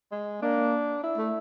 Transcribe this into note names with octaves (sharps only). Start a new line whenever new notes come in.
G#3
A#3 D4
E4
A3